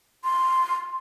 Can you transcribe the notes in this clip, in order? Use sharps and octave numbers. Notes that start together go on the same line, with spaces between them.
C6